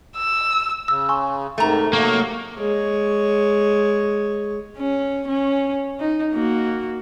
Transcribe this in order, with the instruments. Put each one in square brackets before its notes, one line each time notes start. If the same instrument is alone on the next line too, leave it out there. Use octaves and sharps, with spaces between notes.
[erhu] E6
[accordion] C#3 [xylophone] E6
[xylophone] G#5 C6 C#6
[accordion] G#2 C3 D#3 [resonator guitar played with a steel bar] A3 A#5
[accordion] C3 F#3 C#6 [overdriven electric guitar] A#3
[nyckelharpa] G#3 C#5
[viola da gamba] C#4
C#4
D#4
A#3 F#4